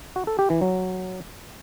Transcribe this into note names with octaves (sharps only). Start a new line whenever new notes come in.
F#4
A4
G4
E3
F#3